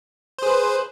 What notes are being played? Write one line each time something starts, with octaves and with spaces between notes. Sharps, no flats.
G#4 B4 C5